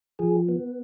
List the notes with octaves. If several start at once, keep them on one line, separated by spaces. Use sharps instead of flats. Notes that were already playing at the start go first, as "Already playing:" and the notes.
F3 G#4
B3